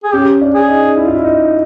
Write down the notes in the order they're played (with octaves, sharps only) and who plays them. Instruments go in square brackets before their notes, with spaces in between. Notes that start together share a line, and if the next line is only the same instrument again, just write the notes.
[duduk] G#4
[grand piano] C#4 [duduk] G4
[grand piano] D4
[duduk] G#4
[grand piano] D#4
E4
F4
E4
D#4